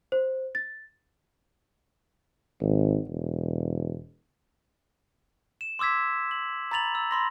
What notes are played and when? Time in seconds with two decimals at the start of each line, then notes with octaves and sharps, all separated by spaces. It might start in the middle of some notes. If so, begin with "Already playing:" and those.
0.12 C5
0.55 A6
2.61 G#1
3.08 E1
5.61 E7
5.79 C6 D6 E6 G#6 B6
6.31 F#7
6.71 A#5 B5 A6 F7 F#7
6.95 E6
7.11 B5 C6 A#6